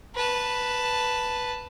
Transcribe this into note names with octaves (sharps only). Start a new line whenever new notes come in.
B4 A5